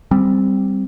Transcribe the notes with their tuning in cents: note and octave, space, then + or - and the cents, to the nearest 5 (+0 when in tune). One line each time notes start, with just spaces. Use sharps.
G3 +0 C4 +0